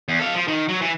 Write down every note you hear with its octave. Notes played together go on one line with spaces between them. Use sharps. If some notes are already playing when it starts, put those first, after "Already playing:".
E2
A4 F5
F3
D#3
F#3
E3